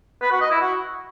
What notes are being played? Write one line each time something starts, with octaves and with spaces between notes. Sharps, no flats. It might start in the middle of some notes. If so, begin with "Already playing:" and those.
B4
F#4
D#5
E4
F#4